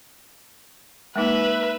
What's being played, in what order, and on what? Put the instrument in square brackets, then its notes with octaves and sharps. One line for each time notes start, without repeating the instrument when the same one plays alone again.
[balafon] G#3 A#3 D#4 [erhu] B4 [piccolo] E5